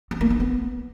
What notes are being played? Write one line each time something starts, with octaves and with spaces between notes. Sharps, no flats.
C4
A#3
D4
B3